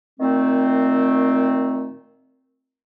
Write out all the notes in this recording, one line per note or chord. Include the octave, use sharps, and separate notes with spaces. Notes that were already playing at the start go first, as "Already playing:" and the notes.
A#2 D#3 A3 C4